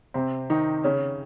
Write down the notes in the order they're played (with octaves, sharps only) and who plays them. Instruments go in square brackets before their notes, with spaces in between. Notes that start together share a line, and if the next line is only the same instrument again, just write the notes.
[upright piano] C3 C4
D#3 D#4
C#3 C#4